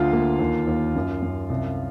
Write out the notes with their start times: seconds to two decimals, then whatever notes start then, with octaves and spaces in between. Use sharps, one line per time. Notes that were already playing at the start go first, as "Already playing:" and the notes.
Already playing: D2 F4 F5
0.13 A#3
0.39 D#2
0.67 D#2
0.95 F#2
1.22 F#2
1.49 C2